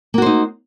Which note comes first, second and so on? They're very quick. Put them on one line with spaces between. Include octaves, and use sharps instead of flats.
A#3 F#4 C5 D#4